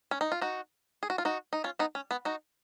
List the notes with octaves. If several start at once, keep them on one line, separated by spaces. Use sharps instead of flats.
C#4
D#4
F4
D#4 F#4
G#4
F#4
F4
D#4 F#4
D#4
C#4 F4
B3 D#4
C#4
B3
D#4 F#4